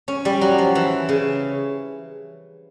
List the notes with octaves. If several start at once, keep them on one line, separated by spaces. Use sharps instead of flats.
C#4
G3
F#3
F3
E3
C#3